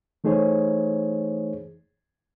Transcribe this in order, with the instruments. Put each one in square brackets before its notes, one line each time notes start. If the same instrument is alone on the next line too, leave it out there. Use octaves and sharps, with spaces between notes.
[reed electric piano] E3 A3 D#4 G#4 C5 C#5